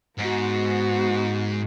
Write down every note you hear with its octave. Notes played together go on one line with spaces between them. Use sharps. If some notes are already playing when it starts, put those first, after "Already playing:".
G#2 B3 F#4